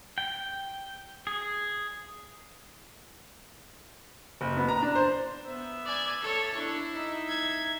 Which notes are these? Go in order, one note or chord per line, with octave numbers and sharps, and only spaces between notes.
G5
G#4
F#1
B3
A#5
D4
C5
B3 E5
D5 G#5
A4 C#5
D4 E4
D#4 E5
G#6